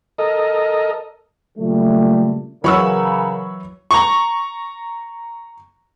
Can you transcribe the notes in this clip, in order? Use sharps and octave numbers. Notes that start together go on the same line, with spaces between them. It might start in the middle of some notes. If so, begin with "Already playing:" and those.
A4 A#4 D#5
A#2 C#3 F#3 G3 A3
C#3 E3 F#3 A#4 C#5 B5 C#6 E6
A#5 C#6